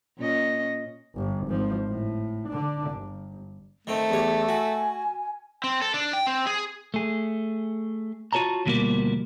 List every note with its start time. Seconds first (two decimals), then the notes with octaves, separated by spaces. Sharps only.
0.18 A#2 C#4 D#5
1.16 G1
1.47 G#1 F3
1.88 A2
2.49 D3 D4
2.91 G1
3.87 D#3 A3 C4
4.10 E2 G4 C#5
4.49 F#4 G#5
5.64 C4
5.82 A4
5.94 D4
6.13 G5
6.27 C4
6.47 G#4
6.94 A3 G#4
8.33 F4 F#4 A4 C#5 A5 A#5
8.66 D2 B2 F3 G3 A3 A#3